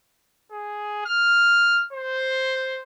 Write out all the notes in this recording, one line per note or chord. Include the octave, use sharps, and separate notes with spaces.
G#4
F6
C5